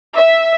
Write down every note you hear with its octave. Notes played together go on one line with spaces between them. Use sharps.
E5